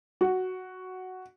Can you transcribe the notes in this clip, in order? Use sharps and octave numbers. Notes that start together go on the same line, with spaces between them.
F#4